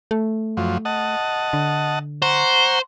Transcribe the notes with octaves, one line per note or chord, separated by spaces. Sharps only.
A3
F#2 F3
D#5 F#5 A5
D3
C5 F#5 A#5 C#6